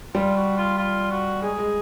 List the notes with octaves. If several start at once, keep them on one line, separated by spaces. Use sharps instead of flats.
G3 F4
F#4
F4
F4
F#4
G#3 G#4
G#3